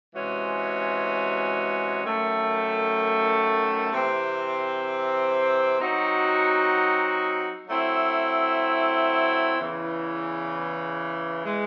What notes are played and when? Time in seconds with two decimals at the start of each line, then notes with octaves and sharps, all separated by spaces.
0.14 C3 E3 G#3 C#4 F#4
2.03 F#2 D#3 A3
3.91 C3 E3 C4
5.80 F#3 C4 D#4 F#4
7.67 F#3 A3 C4 E4
9.56 E2 C#3 E3
11.45 E3 G#3